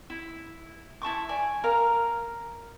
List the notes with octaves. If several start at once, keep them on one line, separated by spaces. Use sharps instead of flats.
E4
E4 A5 C#6 D6
D5 G#5
A#4 F5